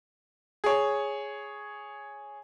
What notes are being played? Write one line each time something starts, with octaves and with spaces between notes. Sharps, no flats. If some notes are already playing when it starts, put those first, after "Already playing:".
G#4 C#5